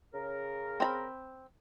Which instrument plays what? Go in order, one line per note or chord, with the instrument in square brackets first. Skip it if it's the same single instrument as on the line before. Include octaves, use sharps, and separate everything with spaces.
[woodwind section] C#3 A#4
[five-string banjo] C4 A#5 B5